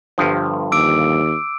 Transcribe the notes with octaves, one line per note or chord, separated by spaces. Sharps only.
G1 G2 F3
D#2 D6 E6 D7